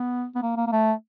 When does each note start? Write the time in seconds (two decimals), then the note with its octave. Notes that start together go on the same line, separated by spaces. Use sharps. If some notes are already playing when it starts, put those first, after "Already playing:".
Already playing: B3
0.35 B3
0.42 A#3
0.57 A#3
0.67 A#3
0.72 A3